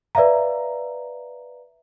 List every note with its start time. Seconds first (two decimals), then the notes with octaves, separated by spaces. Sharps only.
0.15 B4 D5 E5 F5 A#5